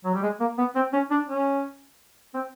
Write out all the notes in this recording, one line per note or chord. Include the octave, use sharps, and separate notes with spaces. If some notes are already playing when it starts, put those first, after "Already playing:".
F#3
G3
G#3
A#3
B3
C4
C#4
D4
C#4
C4